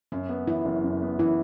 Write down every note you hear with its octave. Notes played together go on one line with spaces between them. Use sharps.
F#2 C#4
B3
E3 E4
F#1
F#2
B3
E3 E4